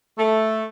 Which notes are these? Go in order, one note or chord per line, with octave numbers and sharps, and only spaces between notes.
A3